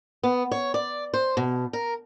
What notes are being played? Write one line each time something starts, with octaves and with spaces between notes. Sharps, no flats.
B3
C#5
D5
C5
B2
A#4